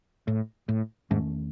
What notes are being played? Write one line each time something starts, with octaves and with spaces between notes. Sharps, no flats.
A2
A2
E2 G#2 D#3 A3 C#4